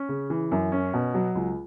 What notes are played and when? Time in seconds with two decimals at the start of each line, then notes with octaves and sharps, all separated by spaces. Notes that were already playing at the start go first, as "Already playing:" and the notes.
Already playing: C#4
0.09 C#3
0.30 E3
0.52 F#2
0.72 C#4
0.93 B2
1.14 F#3
1.35 C#2